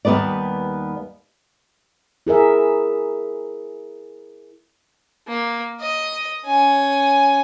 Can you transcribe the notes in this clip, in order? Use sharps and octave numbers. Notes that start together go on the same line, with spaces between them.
D#2 G3 B3 B4 D5
E4 G#4 A#4 E5
A#3
D#5
C#4 G#5